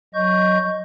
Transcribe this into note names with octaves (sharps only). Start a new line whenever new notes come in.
F#3 D#5 C#6 G6